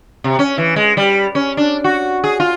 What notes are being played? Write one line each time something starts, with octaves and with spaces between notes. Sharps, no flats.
C3
C#4
E3
G#3
G3
C#4
D4
F#4
G#4
F4